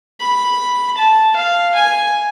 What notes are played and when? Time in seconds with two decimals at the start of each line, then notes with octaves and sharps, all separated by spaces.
0.20 B5
0.97 A5
1.36 F5
1.75 G#5